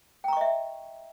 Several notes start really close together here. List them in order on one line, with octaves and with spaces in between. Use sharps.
G5 A#5 C#6 D#5 E5